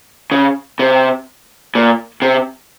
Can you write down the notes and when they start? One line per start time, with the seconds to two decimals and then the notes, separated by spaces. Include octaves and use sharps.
0.32 C#3
0.79 C3
1.75 A#2
2.22 C3